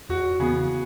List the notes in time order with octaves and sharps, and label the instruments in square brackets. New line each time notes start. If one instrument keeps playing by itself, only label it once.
[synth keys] E2 [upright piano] F#4
[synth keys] C#3 E3 B3 [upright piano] G#4